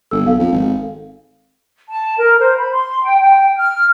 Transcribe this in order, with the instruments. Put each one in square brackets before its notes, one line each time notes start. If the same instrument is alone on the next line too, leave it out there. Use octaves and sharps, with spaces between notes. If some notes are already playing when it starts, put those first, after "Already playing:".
[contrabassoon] G1 [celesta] A4 E6
[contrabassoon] B1 [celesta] A4 F5
[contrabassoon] F2
G#1
[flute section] A5
A#4
C5
B5
C6
G5
G5
F6